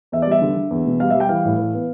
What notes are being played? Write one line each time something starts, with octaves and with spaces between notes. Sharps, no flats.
E2 E5
D5
G3 E5
D3
D3
E2
B2
G3 F5
G3 E5
G5
E3 F5
A2
E3
B3